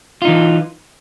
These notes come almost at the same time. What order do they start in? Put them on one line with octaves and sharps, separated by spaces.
F4 D#4 E3